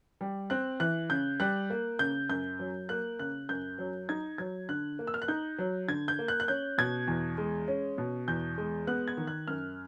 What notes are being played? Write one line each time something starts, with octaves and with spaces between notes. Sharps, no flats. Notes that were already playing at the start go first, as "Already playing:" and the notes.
G3
C4 F#6
E3 F#6
C#3 G6
G3 F#6
A#3
C#3 G6
F#2 G6
F#3
A#3 F#6
C#3 F#6
F#2 G6
F#3
D#4 G#6
F#3 G#6
D3 F#6
A#3
E6
F6
F#6
D#4 G6
F#3
D3 G#6
G6
A#3
F#6
F#6
C#4 G6
B2 G#6
E2
G#3
C#4
B2
E2 G6
G#3
B3 F#6
G#6
D#3
F#6
F#2 F6